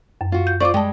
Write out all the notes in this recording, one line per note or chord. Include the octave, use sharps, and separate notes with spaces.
F#2
F4 F#4
G6
F4 C5 D5 C#6 D6
G3 G#3 G5 A5